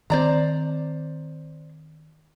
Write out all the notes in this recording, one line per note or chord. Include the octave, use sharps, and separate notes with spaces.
D#3 C4 C5 D5 A#5